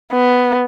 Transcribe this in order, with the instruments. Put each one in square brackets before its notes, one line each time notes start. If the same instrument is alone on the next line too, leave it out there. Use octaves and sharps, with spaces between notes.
[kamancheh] B3